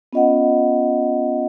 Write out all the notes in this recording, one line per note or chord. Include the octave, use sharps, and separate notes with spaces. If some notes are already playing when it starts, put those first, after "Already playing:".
B3 C#4 F4 D#5 F5 F#5